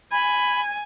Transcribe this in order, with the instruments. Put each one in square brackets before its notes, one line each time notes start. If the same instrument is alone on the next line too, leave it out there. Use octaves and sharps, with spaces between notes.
[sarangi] G#5 [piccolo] B5